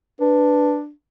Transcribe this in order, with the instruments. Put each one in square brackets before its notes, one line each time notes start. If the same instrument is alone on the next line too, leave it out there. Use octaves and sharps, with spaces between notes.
[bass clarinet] D4 [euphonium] B4